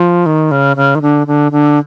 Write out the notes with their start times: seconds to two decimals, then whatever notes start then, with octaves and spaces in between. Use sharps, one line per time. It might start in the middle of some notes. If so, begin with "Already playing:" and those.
Already playing: F3
0.26 D#3
0.51 C#3
0.76 C#3
0.95 D#3
1.02 D3
1.27 D3
1.52 D3